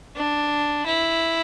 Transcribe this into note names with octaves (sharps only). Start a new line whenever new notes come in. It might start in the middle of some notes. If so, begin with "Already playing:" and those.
D4
E4